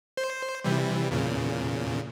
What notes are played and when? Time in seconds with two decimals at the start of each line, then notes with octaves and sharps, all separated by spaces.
0.17 C5
0.64 C3 E3 G3
1.11 E2 A#2 C#3